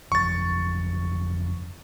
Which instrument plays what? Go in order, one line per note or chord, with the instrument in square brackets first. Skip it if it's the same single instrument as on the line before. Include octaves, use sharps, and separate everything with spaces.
[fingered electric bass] G1 F2 [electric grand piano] C#6 A6